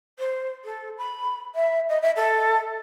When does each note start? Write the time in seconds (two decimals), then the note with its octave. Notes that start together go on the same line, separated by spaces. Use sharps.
0.19 C5
0.64 A4
0.98 B5
1.55 E5
1.89 D#5
2.02 E5
2.16 A4